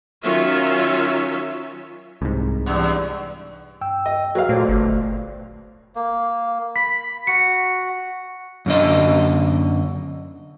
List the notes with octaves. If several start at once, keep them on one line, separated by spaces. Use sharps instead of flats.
D#3 F#3 C#4 F4 E5
C2 G#2
E2 G2
G2 G5 E6
D#5
F#3 G#4 B4 C#5 F5
A#2 A3 C5 D5
G1
A#3
B5 B6
F#4 C#7
F#2 D3 D#5